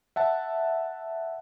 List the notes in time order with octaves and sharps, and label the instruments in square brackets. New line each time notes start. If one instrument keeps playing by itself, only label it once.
[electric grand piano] E5 F#5 A5